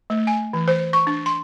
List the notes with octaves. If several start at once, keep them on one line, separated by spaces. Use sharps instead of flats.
A3
G#5
E3
C5
C#6
D4
C6